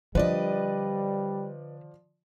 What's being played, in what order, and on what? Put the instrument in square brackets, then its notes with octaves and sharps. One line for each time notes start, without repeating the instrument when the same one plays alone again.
[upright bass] D3 [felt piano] F3 D5 [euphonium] G3 [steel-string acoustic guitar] B4 D#5